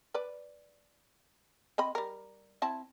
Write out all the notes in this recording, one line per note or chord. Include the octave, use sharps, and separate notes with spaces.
B4 D5
C4 D#5 B5
G3 A#4
C4 E4 A5